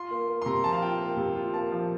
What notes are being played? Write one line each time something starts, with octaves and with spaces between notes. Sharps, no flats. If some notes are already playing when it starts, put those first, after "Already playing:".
Already playing: F4 C6
A#3
A#3
C6
C3 A#5
F3 A5
F5
F4 G5
A#3
C3
F4
A#3 A5
F3